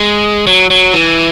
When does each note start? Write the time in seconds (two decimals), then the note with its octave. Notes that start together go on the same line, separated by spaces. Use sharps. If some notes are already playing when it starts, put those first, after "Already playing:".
Already playing: G#3
0.47 F#3
0.70 F#3
0.94 E3